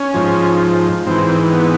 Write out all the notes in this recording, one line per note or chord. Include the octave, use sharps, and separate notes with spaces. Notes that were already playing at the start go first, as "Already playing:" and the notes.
Already playing: C#4
G#2 F3
G#2 E3 C4
B3